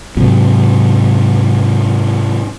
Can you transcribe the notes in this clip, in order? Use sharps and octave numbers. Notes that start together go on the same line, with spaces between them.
G#2 C3 F#3